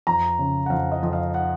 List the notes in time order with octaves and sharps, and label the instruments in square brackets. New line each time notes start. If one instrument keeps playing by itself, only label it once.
[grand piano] F2 A#5
C#3
F#5
F2 F5
D#5
F2
F5
F#5